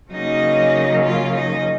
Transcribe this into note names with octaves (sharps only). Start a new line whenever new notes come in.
C#3 F#3 A#3 C#4 D#4 D#5
F4 F5
D#4 D#5